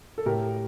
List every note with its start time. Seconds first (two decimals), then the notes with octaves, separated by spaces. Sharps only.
0.18 A4
0.26 A2 G4 A#4